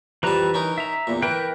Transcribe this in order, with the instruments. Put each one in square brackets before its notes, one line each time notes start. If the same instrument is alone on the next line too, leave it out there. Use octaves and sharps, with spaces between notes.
[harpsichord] F2 G3 A5 [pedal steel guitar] E3 B4 A#5
[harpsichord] C#4 D#4 A#4
[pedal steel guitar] E5 A#5
[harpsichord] E2 A#2
[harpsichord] E3 [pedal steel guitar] A#4 B4 G5